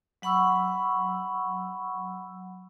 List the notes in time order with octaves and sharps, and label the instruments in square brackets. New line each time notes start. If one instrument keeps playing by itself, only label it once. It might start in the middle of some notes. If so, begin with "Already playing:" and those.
[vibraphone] F#3 F#5 B5 C#6 E6